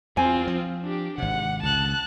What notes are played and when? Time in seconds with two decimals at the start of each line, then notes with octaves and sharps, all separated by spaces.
0.17 E2 C4 F4 G#5
0.47 F3
0.83 D4 G4
1.18 G#1 C3 F#5
1.63 C#2 A5 F#6